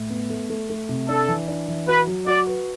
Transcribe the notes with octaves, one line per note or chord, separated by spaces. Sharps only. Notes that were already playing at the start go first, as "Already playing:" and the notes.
Already playing: A2
B3
A3
A3
A3
C3
D4 A4
E3
D4
E3
F#4 B4
F#3
F#4 D5
B4